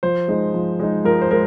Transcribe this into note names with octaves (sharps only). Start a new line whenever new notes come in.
F3 C5
G#3 D#4
F3
G#3 D#4
F3 A#4
C5
G#3 A#4